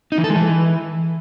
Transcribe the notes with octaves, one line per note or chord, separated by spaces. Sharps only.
D#4
E3
A4
G#3
E3